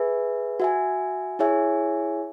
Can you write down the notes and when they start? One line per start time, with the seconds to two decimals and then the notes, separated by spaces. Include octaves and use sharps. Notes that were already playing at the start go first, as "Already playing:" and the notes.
Already playing: G#4 B4 E5 G#5
0.60 F#4 E5 G#5
1.39 E4 G#4 C#5 E5 G#5